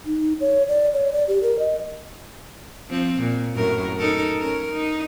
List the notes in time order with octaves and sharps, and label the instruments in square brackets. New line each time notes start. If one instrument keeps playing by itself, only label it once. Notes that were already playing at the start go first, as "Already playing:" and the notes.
[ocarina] D#4
C#5
D5
C#5
D5
G4
A#4
D#5
[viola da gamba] F3 C4
A#2
F#2 A2 A#4
D#4 A4 A#4
C#4 A#4
D#4